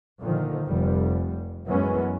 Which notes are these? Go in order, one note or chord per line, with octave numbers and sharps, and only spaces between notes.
A#2 D3 D#3 F3
F1 G3
F#2 E3 F#3 G#3 B3 C#4